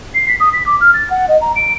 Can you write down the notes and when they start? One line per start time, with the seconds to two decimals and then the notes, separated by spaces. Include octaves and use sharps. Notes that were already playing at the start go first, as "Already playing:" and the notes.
0.15 C7
0.28 B6
0.40 D#6
0.53 B6
0.66 D6
0.81 F6
0.94 A6
1.10 F#5
1.28 D#5
1.41 A#5
1.56 D7